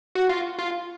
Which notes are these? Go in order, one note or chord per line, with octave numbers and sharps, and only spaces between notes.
F#4
F4
F4